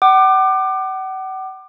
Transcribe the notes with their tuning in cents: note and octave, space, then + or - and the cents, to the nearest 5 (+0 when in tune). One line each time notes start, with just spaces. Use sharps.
F#5 +40 D6 +25